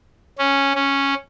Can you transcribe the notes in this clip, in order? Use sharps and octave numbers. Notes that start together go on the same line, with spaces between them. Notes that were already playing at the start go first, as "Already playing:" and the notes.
C#4
C#4